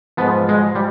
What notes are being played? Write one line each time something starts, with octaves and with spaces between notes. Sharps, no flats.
G#2 F3 B3
G#3
G3